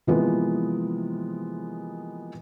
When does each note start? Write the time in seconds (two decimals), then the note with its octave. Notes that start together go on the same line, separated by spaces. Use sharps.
0.07 C3 E3 F3 G#3 A#3 B3